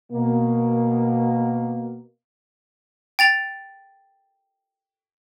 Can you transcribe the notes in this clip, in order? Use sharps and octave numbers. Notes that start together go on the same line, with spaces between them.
B2 A#3
G5 A6 F7